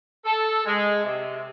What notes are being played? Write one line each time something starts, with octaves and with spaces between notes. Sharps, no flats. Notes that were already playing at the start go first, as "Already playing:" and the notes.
A4
G#3
C3